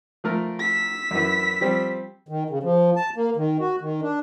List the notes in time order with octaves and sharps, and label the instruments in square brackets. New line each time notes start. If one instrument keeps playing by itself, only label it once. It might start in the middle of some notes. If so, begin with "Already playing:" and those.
[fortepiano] F3 A3 A#4
[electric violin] E6 B6
[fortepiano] F#2 E3
F3 G3 C4
[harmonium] D#3
C#3
F3
A5
A#3
D#3
F#4
D#3
D4